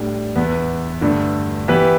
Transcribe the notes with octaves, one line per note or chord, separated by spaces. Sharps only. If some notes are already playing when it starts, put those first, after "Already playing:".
Already playing: A2 G3 D4
E2 E3 B3
G2 D3 A3
E3 B3 G4 B4